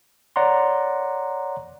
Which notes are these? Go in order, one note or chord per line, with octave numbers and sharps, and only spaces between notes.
C#5 D5 F#5 A#5 C6